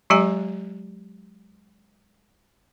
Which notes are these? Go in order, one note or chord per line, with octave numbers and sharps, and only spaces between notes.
F#3 G#3 G4 D#5 G#5 A#5